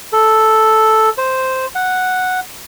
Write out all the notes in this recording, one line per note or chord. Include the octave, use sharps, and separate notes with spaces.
A4
C5
F#5